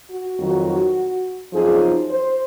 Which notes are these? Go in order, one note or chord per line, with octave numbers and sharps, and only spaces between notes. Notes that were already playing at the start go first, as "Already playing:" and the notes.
F#4
F2 D#3 F#3
F#2 F3 C4 D#4 G#4
C5